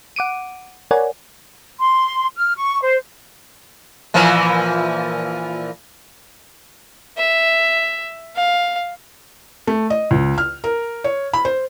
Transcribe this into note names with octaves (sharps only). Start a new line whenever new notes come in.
F#5 D6 D7 D#7
A#4 C#5 D5 F#5 G#5
C6
F6
C#6
C5
A#2 E3 F3
E5
F5
A3
D#5
C#2
F6
A#4
C#5
B5
C5